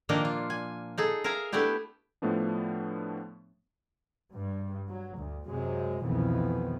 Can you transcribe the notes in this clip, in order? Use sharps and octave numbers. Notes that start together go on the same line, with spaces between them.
A#2 D#3 F3 A#3 D4 D#5
F4
G#5
D#4 G#4 A4
A#4 E5 F5 G#5 A#5
A3 B3 D4 E4 G4
A2 F3 A3 B3 D4
G2
F#3
D2
F#2 C3 F#3 G#3
C2 F2 B2 D#3 E3 B3